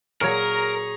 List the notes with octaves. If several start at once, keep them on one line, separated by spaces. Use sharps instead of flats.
A#2 F#3 G#4 A#4 C#5 A#5 C#6